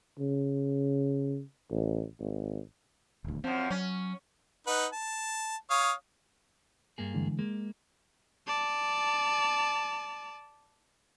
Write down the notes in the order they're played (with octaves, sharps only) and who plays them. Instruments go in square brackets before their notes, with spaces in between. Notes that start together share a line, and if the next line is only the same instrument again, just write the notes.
[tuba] C#3
A1
G#1
[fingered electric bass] D#1 D2
[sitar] F#2 F3 [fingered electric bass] C4
[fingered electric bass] F#3 [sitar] C#4
[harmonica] D#4 B4 F#5
A5
C#5 F5 D#6
[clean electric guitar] G2 A#3 G#4
[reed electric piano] D3 E3 G#3
[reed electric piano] G#3 [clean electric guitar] A#3
[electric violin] D5 A5